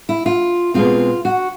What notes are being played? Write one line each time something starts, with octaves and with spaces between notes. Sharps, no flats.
E4
F4
B2 G#3 C4 F4
F#4